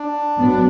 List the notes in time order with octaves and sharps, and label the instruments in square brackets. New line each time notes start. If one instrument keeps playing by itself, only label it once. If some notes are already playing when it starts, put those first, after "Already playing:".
Already playing: [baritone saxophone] D4
[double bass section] F#3 B3